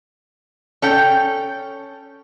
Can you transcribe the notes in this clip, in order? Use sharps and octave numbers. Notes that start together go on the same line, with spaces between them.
C#4 A4 G5